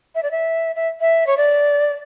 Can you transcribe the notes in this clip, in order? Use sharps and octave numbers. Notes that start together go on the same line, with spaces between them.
E5
D5
E5
E5
E5
C#5
D5